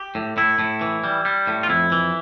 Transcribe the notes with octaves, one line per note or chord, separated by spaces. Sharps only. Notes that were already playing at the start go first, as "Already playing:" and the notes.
Already playing: G4
A2
A2 E4
A2
E3
G3
G3
A2
F4
F2 E4
E3